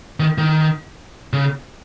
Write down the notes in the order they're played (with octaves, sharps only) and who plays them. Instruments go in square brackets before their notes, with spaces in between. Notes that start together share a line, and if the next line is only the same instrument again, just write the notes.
[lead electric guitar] D#3
D#3
C#3